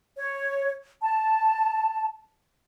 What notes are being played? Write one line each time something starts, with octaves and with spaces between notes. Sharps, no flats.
C#5
A5